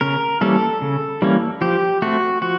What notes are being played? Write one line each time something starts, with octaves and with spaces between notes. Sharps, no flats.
C#3 A#4
E3 G3 A#3 C#4 A4
C#3
E3 G3 A#3 C#4
F3 G4
A3 C4 F#4
F3 F#4